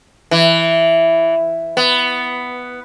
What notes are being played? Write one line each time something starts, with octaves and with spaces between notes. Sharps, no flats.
E3
B3